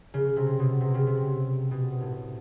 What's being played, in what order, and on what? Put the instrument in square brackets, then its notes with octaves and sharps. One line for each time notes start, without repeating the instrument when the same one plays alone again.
[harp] C#3
C3
B2
C3
C#3
C3
B2
A2